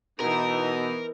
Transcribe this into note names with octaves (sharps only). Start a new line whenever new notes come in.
B2 E3 B3 D#4 A#4